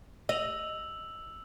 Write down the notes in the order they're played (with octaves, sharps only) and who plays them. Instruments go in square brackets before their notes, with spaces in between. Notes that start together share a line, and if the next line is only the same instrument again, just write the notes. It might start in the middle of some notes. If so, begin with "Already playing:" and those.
[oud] D#5 [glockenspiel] E6 F7 F#7